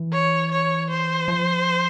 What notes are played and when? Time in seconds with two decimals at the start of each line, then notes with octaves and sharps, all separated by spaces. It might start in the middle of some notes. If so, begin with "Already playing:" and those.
Already playing: E3
0.12 C#5
0.51 C#5
0.90 C5
1.28 F3